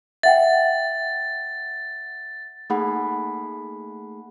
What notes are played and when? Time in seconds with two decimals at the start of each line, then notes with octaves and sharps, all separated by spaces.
0.23 E5 F#5 G5 A6
2.70 A3 A#3 D#4 G#4 F#5 B5